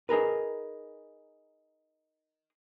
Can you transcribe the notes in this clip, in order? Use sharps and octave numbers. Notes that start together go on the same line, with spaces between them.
D#4 G#4 A#4 B4